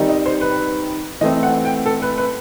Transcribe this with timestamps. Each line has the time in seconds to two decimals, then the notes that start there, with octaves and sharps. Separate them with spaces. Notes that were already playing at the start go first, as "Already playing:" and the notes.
Already playing: D#3 G3 C4 D#4
0.09 D#5
0.26 C5
0.41 B4
1.21 E3 A3 C4 D#5
1.43 F#5
1.65 G5
1.86 A4
2.02 B4
2.18 B4